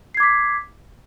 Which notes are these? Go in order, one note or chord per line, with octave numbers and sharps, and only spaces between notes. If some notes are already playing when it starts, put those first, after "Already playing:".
D6 G#6 B6 C7